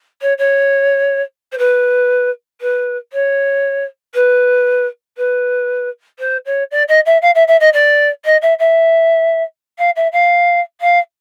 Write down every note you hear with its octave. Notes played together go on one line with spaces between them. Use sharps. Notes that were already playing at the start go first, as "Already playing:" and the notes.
C#5
C#5
C5
B4
B4
C#5
B4
B4
C5
C#5
D5
D#5
E5
F5
E5
E5
D#5
D5
D#5
E5
E5
F5
E5
F5
F5